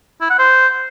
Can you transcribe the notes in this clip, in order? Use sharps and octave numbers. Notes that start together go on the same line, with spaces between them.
E4
F#5
C5